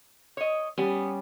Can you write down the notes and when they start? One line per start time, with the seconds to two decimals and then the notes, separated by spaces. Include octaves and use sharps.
0.37 C#5 D#5
0.78 G3 B3 C#4